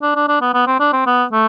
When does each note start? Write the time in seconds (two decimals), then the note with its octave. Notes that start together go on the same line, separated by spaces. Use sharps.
0.02 D4
0.15 D4
0.28 D4
0.41 B3
0.54 B3
0.67 C4
0.80 D4
0.93 C4
1.06 B3
1.32 A3